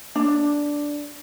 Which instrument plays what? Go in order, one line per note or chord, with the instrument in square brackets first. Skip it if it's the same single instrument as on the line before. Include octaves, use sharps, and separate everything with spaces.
[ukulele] D4